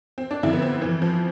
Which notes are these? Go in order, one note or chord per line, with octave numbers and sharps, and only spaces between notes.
C4
D4
F2 D3 E4
B3
C4
F2 E3
F3